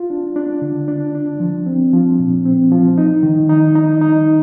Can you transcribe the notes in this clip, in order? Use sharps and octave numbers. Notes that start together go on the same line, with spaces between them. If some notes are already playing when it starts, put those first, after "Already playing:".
Already playing: F4
D4
D4
D3
D4
D4
F3
C4
F3
A#2
C4
F3
D#4
D#3
D#4
D#4
D#4